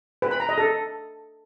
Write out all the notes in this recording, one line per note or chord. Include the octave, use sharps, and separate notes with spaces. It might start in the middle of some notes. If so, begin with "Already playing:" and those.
B4
B5
A#5
D#5
A4